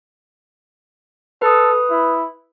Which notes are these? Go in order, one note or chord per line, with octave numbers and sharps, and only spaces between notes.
A4 B4 D#6
E4